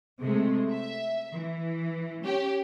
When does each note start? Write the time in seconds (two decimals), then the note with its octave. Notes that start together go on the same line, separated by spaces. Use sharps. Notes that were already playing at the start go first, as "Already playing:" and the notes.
0.22 C3 G#3 A3
0.71 E5
1.33 E3
2.25 C#4 G4 C#5